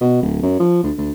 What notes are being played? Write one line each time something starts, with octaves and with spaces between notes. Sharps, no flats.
B2
D1
F#2
F3
D2
D2